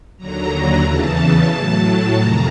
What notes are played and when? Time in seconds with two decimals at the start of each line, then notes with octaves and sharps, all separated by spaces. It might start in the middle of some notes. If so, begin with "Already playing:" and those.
0.18 D#2 D3 F#3 A#5
0.50 A#5
0.83 E2 C#3 E3 A5
1.49 A2 F#3
2.16 F2 C3 D#3 A#5